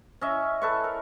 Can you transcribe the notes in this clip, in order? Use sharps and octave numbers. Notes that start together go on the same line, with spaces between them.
C#4 D#5 E5
A4 B4 C#6
A#4